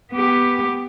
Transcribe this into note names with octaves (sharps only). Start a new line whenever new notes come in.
B3 G4